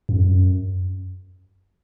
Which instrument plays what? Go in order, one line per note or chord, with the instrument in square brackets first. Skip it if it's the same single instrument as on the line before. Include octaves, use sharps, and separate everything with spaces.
[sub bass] F2
F#2